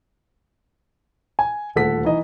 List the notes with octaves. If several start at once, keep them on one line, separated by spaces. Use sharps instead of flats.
G#5
D#1 D2 A4 F#5 B6
E3 D#4 D#5